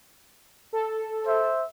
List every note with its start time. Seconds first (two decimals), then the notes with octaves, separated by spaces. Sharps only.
0.73 A4
1.25 C5 E5